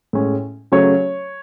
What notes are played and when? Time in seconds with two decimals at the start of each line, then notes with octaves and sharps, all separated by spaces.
0.13 A2 G#3 C#4
0.72 C#3 F#3 A3 C#4 C#5